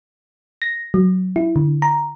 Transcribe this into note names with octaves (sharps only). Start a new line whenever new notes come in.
A#6
F#3
E4
D3
A#5